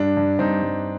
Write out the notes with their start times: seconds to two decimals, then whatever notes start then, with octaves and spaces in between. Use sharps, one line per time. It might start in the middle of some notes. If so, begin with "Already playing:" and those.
Already playing: G2 D4
0.17 G2
0.39 G2 C4 D#4
0.62 G2